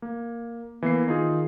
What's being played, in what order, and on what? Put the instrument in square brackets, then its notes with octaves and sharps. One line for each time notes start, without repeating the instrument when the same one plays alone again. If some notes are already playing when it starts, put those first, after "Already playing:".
[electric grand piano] A#3
[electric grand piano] E3 A#3 C7 [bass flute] B3
[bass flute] D#3 [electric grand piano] D#4 F4 G#4